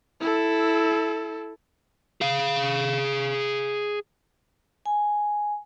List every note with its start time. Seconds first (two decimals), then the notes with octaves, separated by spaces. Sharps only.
0.21 E4 A4
2.21 G#4 F5
4.86 G#5